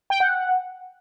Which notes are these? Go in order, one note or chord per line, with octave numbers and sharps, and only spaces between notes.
G5
F#5
F#5